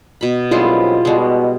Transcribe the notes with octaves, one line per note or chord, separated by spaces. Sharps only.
B2 B5
B1 F#2 G3 G#3 C4 E4 F4
B2 G3 G#3